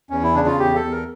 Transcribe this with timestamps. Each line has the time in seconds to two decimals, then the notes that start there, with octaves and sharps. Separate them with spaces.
0.10 E2 C#4
0.23 E4
0.34 C#3 D4
0.47 F4
0.59 E2 G4
0.76 A4
0.84 E2
0.91 A#4